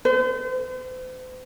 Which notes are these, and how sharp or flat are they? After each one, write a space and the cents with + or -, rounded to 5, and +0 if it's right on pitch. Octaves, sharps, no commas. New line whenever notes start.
C5 -40